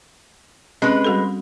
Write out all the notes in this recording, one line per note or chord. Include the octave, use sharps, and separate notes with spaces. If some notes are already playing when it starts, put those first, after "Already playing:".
G#3 C4 C#4 B4
G3 F#4 A4